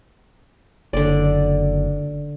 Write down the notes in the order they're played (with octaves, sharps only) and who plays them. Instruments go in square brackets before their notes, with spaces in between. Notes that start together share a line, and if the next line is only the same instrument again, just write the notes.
[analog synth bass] F#1 [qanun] D3 D5